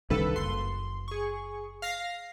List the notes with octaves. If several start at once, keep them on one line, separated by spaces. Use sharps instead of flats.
C2 G2 D#3 A4 B4
F#1 C6
G#4 C#6
F5 A#6 C7